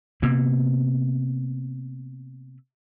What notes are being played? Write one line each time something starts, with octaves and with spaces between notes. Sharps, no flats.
C3 A#3 B3